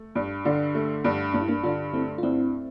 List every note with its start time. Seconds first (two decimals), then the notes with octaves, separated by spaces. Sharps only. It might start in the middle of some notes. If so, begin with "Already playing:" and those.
Already playing: A3
0.15 G2
0.45 D3
0.74 A3
1.04 G2
1.34 G2 D4
1.41 E4
1.49 A#3 D4
1.64 D3 D4 F4
1.93 A3 C4 E4
2.18 F4
2.23 G2 C4 E4